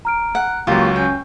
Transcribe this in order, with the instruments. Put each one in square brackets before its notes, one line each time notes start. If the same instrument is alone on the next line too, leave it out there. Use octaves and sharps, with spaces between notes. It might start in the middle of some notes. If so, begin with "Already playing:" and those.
[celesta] A#5 F6 D7
[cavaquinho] F#5
[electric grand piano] C#2 F#3 [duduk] A#3 [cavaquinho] F4 G4
[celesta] C#6
[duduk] C#4 [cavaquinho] G5